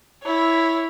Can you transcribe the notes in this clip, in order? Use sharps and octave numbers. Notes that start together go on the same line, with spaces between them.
E4 C#5